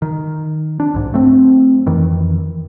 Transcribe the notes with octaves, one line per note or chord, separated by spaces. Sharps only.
D#3
D4
B1 G#2
F#3 A3 C4
F2 D#3 E3